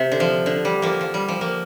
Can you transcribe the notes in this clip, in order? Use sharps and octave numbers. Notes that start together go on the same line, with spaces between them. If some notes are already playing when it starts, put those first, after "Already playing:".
Already playing: C3
D3
F3
D3
G3
F3 A#3
F3
G3
F3
F3 A#3